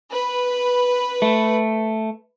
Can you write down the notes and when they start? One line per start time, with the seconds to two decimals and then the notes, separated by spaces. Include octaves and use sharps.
0.11 B4
1.22 A3